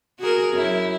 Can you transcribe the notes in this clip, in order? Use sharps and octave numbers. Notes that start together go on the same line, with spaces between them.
F#4 G#4 A#4
F#2 E4